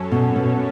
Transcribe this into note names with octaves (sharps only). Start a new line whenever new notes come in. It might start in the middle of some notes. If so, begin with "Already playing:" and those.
Already playing: F#2 F#3 C#4 A4 C#5
B2
B2